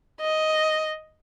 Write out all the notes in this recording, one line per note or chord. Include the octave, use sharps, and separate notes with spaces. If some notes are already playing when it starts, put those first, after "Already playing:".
D#5